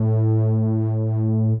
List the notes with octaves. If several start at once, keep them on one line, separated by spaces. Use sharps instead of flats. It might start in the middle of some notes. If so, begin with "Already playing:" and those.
Already playing: A2